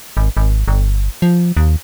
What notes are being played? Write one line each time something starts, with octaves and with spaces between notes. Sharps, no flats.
G#1
G#1
G1
F3
D#2